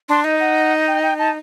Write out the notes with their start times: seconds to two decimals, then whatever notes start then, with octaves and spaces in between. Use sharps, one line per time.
0.09 D4 C6
0.24 D#4 D#5
0.40 F#5
0.88 G5
1.03 G5
1.19 A5